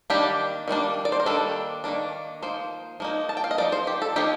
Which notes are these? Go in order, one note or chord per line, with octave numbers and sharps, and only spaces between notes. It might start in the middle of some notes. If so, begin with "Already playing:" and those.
D#3 G3 A#3 D4 G4
D#3 G3 A#3 D4
D5
C5
A#4
D#3 G3 A#3 D4 A4
D#3 G3 A#3 D4
F3 A#3 D#4 C5
F3 A#3 D#4
A5
G5
F5
D#5
F3 A#3 D#4 D5
C5
G4
A4
F3 A#3 D#4 G4